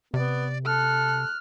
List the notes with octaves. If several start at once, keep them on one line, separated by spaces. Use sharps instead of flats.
C3 B3 D5
A4 F6 F#6